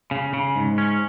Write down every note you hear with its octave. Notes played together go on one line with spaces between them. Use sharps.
C#3
C#3
G#2
C#4